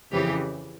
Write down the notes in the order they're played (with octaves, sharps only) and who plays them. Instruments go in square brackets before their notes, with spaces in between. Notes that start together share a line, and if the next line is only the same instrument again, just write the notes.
[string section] F2 C#3 E3 G4